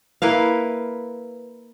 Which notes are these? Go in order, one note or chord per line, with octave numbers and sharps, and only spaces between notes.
A#3 E4 B4 F5